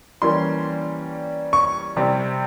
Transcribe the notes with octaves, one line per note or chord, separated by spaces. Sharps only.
E3 G3 A#3 C#4 C6
C#6
C3 G3 C4